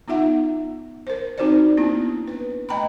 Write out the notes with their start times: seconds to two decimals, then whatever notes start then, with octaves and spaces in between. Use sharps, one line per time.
0.08 B3 D#4 F4 E5 F#5
1.07 A#4 C5
1.38 C4 D#4 F#4 A#4 C5 D5
1.77 A#3 B3 D4 E4
2.28 B4
2.69 A3 D#5 G5 A#5 B5